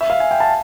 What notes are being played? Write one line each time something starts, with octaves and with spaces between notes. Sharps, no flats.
E5
F5
G#5
G5
A5